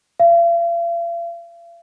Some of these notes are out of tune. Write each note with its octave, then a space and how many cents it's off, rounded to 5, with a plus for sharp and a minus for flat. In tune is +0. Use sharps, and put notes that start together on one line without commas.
F5 -45